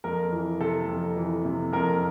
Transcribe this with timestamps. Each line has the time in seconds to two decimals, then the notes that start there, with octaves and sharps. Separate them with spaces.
0.04 F2 A#4
0.32 E3
0.60 C3 A4
0.88 F2
1.16 E3
1.45 C3
1.72 F2 A#4